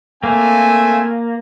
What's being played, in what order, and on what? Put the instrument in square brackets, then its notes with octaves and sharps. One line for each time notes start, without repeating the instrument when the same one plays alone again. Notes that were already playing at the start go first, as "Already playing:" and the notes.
[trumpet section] A3 C4 G#5 [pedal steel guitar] A#3